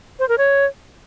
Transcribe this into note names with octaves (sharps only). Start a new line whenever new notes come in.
C5
A#4
C#5